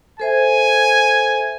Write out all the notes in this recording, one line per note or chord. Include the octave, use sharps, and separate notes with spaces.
A4 C5 E5 G#5